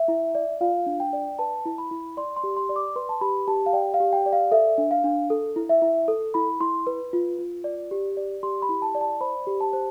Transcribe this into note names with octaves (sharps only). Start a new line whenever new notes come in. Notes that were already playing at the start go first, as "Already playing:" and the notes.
Already playing: E5
E4
D5
F4 F5
D4
G5
D5
B4 A5
E4
B5
E4
D5 C6
C6
G4
C6
D5
D6
B4 C6
A5
G4 B5
G4 A5
F5
D5 G5
F5
G4
G5
D5
F5
A4 E5
D4
F5
D4
A4
E4
E5
E4
A4
E4 B5
E4 C6
B4
F4
F4
D5
G4
D5
G4 C6
B5
E4
A5
D5
A5
C5 B5
G4
A5
C5